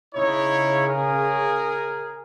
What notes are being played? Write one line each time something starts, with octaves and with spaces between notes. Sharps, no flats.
C#3 D#4 E4 C#5
G#4 A#4